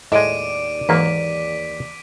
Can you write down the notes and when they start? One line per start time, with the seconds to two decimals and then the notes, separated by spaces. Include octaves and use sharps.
0.12 D#2 A2 G#3 D5 D#5 D6 D7 D#7
0.89 G#2 E3 F#3 A#3 B6